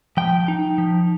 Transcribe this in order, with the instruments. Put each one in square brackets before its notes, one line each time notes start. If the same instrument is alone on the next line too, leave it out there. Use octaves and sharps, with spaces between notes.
[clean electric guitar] F3 G5
D#4
F3